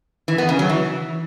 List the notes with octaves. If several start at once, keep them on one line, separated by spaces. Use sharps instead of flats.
E3
B3
C#3
F#3
E3